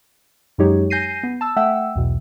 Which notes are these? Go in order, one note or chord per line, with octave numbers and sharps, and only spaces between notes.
F#2 F#3 G#3 D#4 G4 C#5
G#5 G6 A#6 C7 D#7
B3
A5 E6
A3 E5 F#5 G5 E6
B1 E2 B2